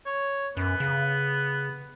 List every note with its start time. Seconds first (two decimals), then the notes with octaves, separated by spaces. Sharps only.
0.06 C#5
0.57 F#2 B3
0.80 C#3